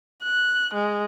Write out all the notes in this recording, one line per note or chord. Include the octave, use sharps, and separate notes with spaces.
F#6
G#3